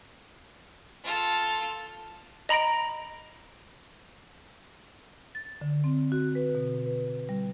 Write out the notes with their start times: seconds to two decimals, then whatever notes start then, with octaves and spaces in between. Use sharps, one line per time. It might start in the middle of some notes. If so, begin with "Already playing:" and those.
1.04 F4 A4
2.49 D#5 A#5 B5 A#6 D7
5.35 A6
5.61 D3
5.84 C4
6.12 F#4
6.35 B4
6.55 B2
6.86 B4
7.29 G3